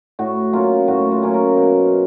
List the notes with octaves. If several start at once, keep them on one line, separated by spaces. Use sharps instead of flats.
A2 F#4
F#3 A#3 C#4 F4
A2 F#4
F4
F#3 A#3 C#4
A#4
B2